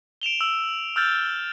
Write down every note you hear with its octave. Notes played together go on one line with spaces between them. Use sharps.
D7 E7 F7 G7
E6
E6 F6 G6 A6